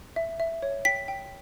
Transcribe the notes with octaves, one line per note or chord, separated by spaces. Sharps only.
E5
E5
C#5
G5 B6
G5